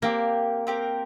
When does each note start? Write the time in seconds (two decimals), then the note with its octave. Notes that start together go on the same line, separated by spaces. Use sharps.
0.02 A#3 C4 G4 A#4
0.67 C4 G4 A#4